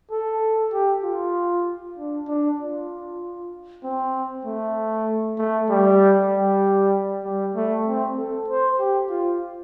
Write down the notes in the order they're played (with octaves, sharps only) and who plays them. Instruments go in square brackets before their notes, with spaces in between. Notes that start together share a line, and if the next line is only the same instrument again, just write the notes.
[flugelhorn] A4
G4
F4
D4
D4
F4
C4
A3
A3
G3
G3
G3
A3
C4
A4
C5
G4
F4